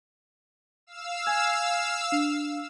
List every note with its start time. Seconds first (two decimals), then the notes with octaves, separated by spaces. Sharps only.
0.87 F5 E6
1.26 G#5 G#6
2.12 D4